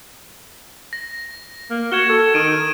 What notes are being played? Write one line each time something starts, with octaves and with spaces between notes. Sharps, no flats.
A#6
A#3
F#4 G#6 E7 G7
A4
D#3 D7 D#7